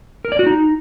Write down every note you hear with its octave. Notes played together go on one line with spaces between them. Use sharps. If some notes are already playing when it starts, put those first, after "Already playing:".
A#4
D5
F#4
D#4